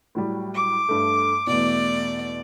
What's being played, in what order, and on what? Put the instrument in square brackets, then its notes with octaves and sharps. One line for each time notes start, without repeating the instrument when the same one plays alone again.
[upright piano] A2 F#3 G3
[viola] D6
[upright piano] G2 A3
[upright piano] E2 B2 [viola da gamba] A3 D5